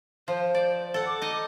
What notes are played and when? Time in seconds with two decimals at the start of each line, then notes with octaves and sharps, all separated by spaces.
0.28 F3 C5
0.55 D5
0.94 A4 F#5
1.06 D6
1.22 D#4 D#5